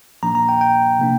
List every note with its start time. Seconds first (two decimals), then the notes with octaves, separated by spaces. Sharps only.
0.23 A#2 F3 A#3 D4 A#5
0.35 A#5
0.49 G5
0.61 G5
0.99 C3 A#3 D4